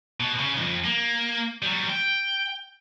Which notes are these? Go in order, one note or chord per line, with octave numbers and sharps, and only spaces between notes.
B2
C#3
B1 F2
A#3
F#3 G3
G5